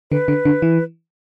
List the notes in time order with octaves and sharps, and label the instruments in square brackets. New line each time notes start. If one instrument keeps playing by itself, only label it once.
[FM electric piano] D3 [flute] B4
[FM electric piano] D3
D3
E3